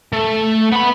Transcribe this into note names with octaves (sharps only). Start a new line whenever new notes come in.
A3
B3 B5